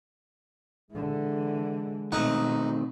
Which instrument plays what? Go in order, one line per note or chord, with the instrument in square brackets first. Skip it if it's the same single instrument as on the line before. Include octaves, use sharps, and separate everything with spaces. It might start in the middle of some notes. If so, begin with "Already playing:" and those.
[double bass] D3 E3 [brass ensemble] G#3
[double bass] B2 [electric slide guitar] D#3 A3 C4 [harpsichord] D#4 F#5